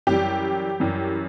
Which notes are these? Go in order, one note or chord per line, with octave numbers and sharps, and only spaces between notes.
F#2 E3 G3 G4
F#2 E3 G3